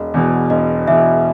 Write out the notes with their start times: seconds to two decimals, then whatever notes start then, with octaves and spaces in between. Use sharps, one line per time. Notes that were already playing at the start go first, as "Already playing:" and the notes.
Already playing: E1 D#5
0.14 E2 B2
0.50 E1 D#5
0.87 E2 B2 E5